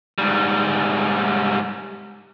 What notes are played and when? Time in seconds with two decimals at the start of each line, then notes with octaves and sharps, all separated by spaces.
0.18 G#2 G3